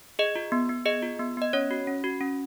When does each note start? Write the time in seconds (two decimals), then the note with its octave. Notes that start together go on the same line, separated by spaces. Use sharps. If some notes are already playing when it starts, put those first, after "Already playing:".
0.19 G#4 D#5
0.36 F4
0.52 B3
0.69 B3
0.86 G#4 D#5
1.02 F4
1.20 B3
1.37 B3 D#5
1.53 C#4 C#5
1.71 F#4
1.87 C#4
2.04 F#4
2.21 C#4